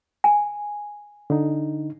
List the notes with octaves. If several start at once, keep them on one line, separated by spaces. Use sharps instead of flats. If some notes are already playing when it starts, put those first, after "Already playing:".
G#5
D3 D#4